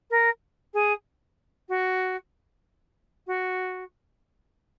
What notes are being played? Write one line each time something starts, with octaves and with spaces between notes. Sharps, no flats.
A#4
G#4
F#4
F#4